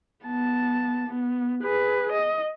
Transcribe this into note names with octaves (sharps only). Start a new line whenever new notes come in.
B3 A5
B3
G#4 B4
D#5